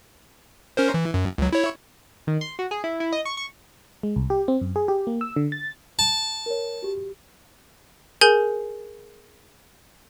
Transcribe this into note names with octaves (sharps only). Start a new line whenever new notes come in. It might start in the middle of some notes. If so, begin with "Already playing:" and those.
C#4 A#4 C5
E3
F#2
C#2 F#3
E4 C#5
D#3
C6
F#4
G#4
E4
E4
D#5
C#6
C#6
G#3
C2
G4
C4
F#2
G#4
G4
A#3
E6
D3
A6
A5
A#4 C#5
F#4 G4
G#4 A#4 G#5 G6